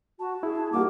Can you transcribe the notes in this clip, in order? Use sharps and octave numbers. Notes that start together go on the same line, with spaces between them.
F#4 A5
E4 G#4
G3 A#3 F#4 D6